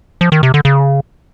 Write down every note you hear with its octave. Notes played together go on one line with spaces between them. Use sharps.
F3
D#3
C3
D3
C#3